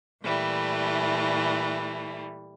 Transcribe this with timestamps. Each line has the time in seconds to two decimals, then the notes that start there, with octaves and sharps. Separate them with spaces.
0.23 A#2 E3 G3 A3